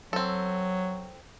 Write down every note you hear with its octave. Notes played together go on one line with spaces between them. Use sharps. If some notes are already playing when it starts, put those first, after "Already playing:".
F#3 C4 A4